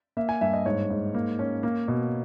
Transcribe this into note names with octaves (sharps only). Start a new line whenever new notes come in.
A#3 E5
G#5
G2 E5
D#5
G#2 C#5
G#2
A#3
C#4
A#3
B2